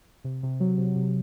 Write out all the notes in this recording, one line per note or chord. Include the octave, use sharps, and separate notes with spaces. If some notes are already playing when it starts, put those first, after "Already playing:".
C3
C3
F#3
C3
C3